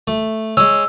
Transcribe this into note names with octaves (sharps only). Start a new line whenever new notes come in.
A3
G#3 C#4 E6